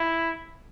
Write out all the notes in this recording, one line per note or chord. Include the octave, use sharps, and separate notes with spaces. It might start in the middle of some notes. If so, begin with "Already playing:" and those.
Already playing: E4